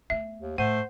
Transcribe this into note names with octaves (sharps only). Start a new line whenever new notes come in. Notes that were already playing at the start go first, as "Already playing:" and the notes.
A3 B3 E5
D#2
A2 A3 C5 F#5